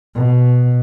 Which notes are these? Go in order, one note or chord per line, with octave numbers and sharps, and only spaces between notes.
B2